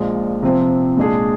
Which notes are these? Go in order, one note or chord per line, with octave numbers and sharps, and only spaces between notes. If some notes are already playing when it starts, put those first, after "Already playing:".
Already playing: A#1 A#2 G#3
C3 F3 C4
A#2 G#3 D4 G#4